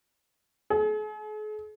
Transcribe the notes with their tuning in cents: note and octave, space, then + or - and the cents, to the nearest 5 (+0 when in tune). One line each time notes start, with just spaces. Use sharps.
G#4 +45